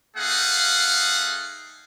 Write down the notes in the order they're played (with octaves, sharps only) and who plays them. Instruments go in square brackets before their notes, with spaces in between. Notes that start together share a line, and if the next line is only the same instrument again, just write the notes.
[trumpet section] A3 D#4 G#4 F5 F#5